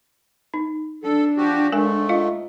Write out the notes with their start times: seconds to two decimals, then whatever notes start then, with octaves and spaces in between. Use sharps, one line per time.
0.54 D#4
1.04 D4 A4
1.37 F3 F#4 G4
1.72 G#2 G#3 A3 A#4 G#5
2.09 F4 D#5 F5